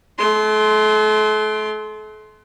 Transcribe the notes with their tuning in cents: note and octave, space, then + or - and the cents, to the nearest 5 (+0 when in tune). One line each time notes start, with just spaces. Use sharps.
A3 -40 C6 +0